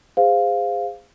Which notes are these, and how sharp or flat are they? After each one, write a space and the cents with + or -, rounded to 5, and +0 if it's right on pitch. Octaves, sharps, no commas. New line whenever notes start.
G#4 -25 C5 -15 F5 +0